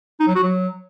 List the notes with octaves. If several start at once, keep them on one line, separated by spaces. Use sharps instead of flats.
D#4
F#3
F#4
F#3